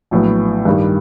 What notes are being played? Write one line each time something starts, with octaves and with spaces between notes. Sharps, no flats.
A#1 A2 F#3 B3
G2 D#3 G3